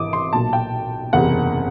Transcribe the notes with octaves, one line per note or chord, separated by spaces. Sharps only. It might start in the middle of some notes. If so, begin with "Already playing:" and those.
Already playing: G#1 E3 D6 D#6
C6
B1 A#2 F#3 A5
G5
F#1 E2 C3 F#5